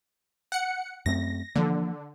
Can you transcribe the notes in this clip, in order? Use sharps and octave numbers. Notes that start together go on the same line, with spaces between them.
F#5 C#7
F#2 A3 C4 A#6
D3 E3 F3 A#3